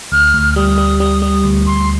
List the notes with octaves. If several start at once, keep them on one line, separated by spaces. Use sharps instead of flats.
D2 F6
D2
G3 D#6
G3
G3 D#6
G3 D#6
D2
D2 C6